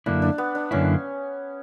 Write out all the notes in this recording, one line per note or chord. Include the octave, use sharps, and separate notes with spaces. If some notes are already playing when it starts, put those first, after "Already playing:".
F#2 D3 A#3 D4 E4
D4
B3
D4
F#2 D3 A#3 C#4 E4